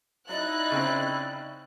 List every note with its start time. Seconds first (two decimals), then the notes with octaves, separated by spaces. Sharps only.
0.29 F#3 D#4 E4 D5 F#6
0.71 C#3 C4